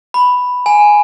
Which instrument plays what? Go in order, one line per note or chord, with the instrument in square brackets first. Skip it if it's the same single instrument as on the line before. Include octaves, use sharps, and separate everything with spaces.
[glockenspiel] B5
G#5